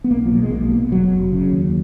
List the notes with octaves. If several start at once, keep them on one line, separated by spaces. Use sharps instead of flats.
B3
B1 A#3
F3
B2 F#3
G#3
B1 A#3
B2
F1 F#3
F1
C#3
D#2